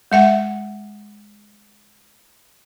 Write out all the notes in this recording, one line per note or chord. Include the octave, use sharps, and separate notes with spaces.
G#3 E5 F#5